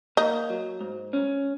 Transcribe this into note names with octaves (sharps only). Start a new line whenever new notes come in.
A#3 D#4
F#3
G#2
C#4